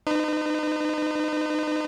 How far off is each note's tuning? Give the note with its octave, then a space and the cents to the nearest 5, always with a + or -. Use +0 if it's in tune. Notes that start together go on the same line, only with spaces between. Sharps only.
D#4 -30 B4 +40